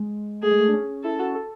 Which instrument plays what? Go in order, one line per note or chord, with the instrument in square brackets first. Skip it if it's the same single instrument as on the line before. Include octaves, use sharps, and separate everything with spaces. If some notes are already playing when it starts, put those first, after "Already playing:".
Already playing: [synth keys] G#3
[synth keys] A3 [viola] G#4
[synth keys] G#3
A3
D4
C#4
[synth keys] E4 [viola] A4
[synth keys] F#4
A4